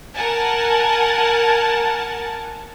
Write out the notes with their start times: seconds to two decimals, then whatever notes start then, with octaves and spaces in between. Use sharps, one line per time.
0.14 A#4 F#5 G#5 A5